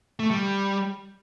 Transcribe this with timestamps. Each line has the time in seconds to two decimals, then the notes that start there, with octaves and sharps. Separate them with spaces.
0.20 A3
0.31 G3